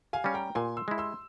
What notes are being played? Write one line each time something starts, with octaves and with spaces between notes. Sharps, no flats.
F5 G#5
G3 C#4
G5 A#5
A#2 G#5 C6
C6 E6
G#3 E4
C6 E6